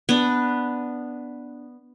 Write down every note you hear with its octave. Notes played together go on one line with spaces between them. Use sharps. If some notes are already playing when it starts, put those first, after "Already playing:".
B3 D4